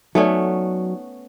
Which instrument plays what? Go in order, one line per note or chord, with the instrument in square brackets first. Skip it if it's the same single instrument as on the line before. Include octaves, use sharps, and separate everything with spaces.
[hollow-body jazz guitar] F#3 [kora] A3 B3 C#4 [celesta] D#4 D5